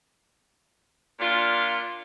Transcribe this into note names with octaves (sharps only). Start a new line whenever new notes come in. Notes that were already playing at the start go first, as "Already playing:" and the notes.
A#2 D4 F4